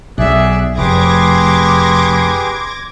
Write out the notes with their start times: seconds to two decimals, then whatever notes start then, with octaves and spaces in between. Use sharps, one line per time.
0.18 B1 G#4 D5 E5 F#6
0.78 F1 G4 G#4 B4 C6 D6 G#6 A#6